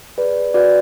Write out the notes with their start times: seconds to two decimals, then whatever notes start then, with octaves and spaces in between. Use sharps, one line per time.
0.18 G#4 B4 D5
0.54 F#4 B4 D5